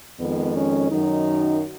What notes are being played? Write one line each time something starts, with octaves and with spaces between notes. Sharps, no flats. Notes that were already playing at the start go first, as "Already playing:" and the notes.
F2 D#3 G#3 B3
C#4
F#2 D#3 F#3 D#4